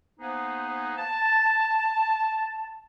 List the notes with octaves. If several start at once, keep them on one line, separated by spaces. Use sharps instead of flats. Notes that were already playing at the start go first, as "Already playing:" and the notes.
A#3 B3 D#4 G#4 B4 C5
A5